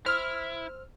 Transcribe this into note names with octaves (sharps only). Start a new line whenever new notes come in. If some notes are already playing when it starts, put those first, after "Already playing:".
E4 C5 E6 F6